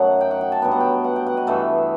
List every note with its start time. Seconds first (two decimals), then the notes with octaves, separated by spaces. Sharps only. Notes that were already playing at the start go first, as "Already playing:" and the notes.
Already playing: F#2 F#3 A3 D#4 F#5
0.21 G5
0.31 F#5
0.41 G5
0.52 A5
0.62 G2 F#3 B3 G5
0.72 F#5
0.80 G5
1.04 F#5
1.16 G5
1.27 F#5
1.37 D#5
1.47 G2 E3 A3 E5